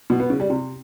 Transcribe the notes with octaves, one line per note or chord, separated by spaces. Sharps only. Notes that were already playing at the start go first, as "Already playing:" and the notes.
B2
B3
C#3
G3
C3